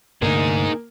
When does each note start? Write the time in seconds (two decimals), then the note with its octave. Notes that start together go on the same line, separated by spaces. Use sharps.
0.22 D2 G2 C3 A#3 D4 D#4 G#4